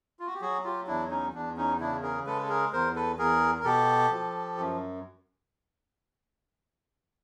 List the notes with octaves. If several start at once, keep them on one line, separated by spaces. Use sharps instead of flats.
F4
F#4
G4
F#3 F#4 G#4
F4 G4
E2 D4 E4
C#4 D#4
E2 D4
C#4 D#4
C#3 D4 E4
G#4 A#4
G#3 A4 B4
A4
G#4 A#4
E2 A#4 C5
A4 B4
E2 G#4 A#4
A#4
B2 G4 A4
F3
F#2